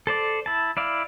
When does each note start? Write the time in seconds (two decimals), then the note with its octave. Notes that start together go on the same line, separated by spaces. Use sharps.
0.07 A4 C5 D5
0.46 E4 A5
0.77 E4 D5 F5